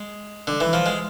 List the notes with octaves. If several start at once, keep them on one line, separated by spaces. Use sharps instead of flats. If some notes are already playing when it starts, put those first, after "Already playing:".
Already playing: G#3
D3
E3
F3
G#3